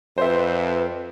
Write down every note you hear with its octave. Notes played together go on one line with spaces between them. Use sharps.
F2 B4 C5 E5